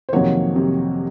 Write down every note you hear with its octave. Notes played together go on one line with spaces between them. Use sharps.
C5
F2 C3 D#3 F#3 A#3 C#5
C3